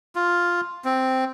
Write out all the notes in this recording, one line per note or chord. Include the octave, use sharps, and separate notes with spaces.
F4
C4